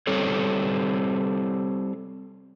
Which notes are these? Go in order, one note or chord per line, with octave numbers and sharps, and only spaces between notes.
G3 C4 A4 C#5